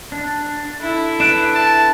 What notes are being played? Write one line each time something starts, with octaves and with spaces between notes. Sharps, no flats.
D4
E4 A4
D4 B4 F#6 D7 E7
A5